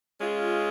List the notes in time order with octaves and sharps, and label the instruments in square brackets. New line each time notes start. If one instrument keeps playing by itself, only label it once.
[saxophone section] G#3 C#4 F4 G#4